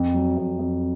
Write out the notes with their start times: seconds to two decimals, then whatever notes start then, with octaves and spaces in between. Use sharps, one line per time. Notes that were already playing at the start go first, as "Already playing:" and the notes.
Already playing: F2
0.14 F#3
0.37 F2
0.59 F2